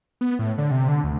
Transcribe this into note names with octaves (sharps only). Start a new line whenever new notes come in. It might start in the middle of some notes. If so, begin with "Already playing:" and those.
B3
A2
D3
C3
D3
D2